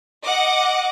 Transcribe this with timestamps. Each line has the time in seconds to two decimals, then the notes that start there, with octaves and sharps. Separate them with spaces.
0.23 D#5 F#5 D6